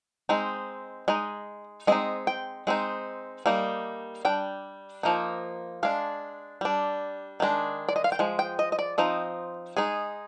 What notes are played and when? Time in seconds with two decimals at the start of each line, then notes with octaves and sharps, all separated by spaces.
0.29 G#3 C4 D#4
1.08 G#3 D#4 D#5
1.87 G#3 C4 D#4 D#5
2.27 G5
2.67 G#3 C4 D#4
3.46 G3 A#3 D#4
4.25 G3 D4 G5
5.03 F3 A#3 D#4
5.83 G#3 D4 F5
6.61 G3 D4
7.40 D#3 G#3 D4
7.89 D5
7.96 D#5
8.04 F5
8.12 G5
8.19 F3 G#3
8.39 G5
8.59 D#5
8.72 D#5
8.79 D5
8.98 F3 C4 D#4 D#5
9.77 G#3 D#4 G#4